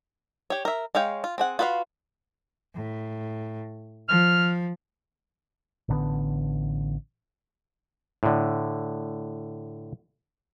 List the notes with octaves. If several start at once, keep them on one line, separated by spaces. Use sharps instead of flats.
G4 C#5
A#4 E5
G#3 C#5 F5 G5
F4
C4 G#4 F#5
F4 F#4 B4 E5 F5
A2
F3 F6
A1 D3 B3
A2 D3